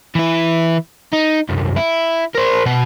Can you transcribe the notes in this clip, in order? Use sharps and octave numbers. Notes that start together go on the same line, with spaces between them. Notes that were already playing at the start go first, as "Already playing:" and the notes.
E3 E4
D#4
C2 F#2
E4
A#4 C5
B2 F#4